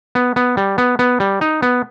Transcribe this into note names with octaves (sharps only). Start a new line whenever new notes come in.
B3
B3
G3
B3
B3
G3
D#4
B3